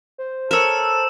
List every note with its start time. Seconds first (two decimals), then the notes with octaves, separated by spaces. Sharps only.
0.18 C5
0.51 A4 A#4 C#5 E6 E7